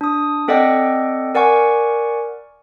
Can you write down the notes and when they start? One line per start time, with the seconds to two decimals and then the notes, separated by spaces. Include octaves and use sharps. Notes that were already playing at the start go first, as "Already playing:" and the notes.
0.01 D4 D#6
0.48 C4 A4 D5 D#5 F#5 G5
1.35 A#4 D5 F#5 G#5 C#6